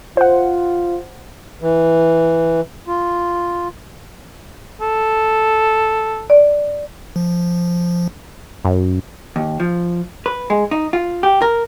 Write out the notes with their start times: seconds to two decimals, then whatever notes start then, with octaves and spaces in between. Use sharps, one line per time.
0.17 F4 C5 F#5
1.61 E3
2.88 F4
4.81 A4
6.30 D5
7.16 F3
8.65 F#2
9.36 D#2
9.60 F3
10.26 B4
10.50 G#3
10.71 D#4
10.93 F4
11.23 G4
11.42 A#4